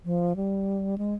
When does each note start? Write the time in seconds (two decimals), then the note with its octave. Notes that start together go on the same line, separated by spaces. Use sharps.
0.05 F3
0.36 G3
0.98 G#3